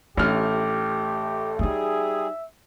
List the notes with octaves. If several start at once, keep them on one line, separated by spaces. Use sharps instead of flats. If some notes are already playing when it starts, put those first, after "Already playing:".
A1 A3 D4 G4 F6
G2 G3 D#4 G#4 E5